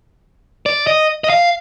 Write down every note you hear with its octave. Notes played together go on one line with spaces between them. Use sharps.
D5
D#5
D#5
F5